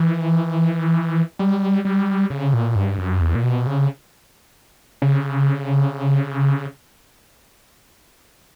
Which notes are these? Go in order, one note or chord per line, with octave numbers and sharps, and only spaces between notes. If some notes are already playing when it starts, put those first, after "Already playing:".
Already playing: E3
G3
G3
C#3
A#2
G2
F#2
E2
A#2
B2
C#3
C#3